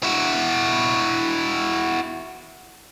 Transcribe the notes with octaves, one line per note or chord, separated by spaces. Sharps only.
E4 F#4